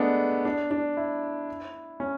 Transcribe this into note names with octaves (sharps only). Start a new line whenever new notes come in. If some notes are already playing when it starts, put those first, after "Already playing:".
Already playing: G#3 A3 B3 D4
D4
D4
E4
C#4